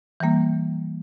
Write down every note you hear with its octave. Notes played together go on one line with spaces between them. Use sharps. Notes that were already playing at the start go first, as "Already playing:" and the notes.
E3 G3 A#3